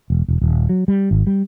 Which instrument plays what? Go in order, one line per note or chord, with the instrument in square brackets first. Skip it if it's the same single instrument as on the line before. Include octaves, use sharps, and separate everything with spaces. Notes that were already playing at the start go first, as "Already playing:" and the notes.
[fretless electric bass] E1
E1
D#1
F#3
G3
G#1
G3